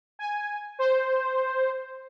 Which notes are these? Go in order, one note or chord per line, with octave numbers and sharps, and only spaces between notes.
G#5
C5